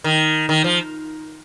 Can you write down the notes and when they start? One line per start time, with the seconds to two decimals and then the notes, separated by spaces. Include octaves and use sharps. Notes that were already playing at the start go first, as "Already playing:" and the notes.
0.04 D#3
0.49 D#3
0.64 F3